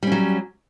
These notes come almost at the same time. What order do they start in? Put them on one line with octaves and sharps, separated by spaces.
G3 C#4 F#3